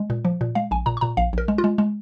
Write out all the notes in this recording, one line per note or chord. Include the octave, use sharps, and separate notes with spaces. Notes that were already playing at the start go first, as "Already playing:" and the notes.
Already playing: G#3
A#2
F3
A#2
G#3 F5
A#1 G#5
A#2 A#5
C#6
A#2 A#5
A#1 F5
A#1 A#4
G#3
F4
G#3
G#3